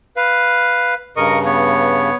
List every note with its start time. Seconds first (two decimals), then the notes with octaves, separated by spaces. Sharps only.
0.17 B4 F5
1.17 G2 C#3 A#4 D#5 C#6
1.45 B3 C#5